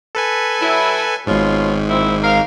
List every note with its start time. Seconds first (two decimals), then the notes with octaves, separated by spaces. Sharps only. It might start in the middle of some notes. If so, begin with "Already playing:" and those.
0.15 A4 B4 G#5
0.60 F#3 E4
1.27 G#1 G#2 B2 F4 C#5
1.88 A#2 C4 E4
2.22 A#4 F5